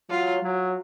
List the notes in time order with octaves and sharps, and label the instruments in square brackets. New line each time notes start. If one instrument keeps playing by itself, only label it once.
[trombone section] F#3 [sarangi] F4
[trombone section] F#3